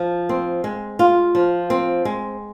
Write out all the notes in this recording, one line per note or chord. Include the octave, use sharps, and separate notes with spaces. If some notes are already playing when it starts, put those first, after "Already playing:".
Already playing: F3
C4
G#3
F4
F3
C4
G#3